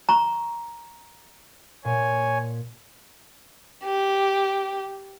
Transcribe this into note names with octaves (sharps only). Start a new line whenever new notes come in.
A#5 C#6
A#2 C#5 G#5
G4